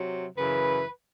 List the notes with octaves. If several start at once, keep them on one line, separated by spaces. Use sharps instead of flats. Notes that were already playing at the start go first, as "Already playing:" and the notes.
Already playing: C3 F#3
F#2 C#3 E3 B4